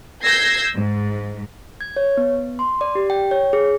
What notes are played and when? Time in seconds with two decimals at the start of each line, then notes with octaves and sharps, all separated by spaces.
0.24 E6 G6 G#6 A#6 C7
0.74 G#2
1.81 G#6
1.96 C#5
2.17 B3
2.59 C6
2.81 D5
2.95 G4
3.10 G5
3.31 C#5
3.53 G#4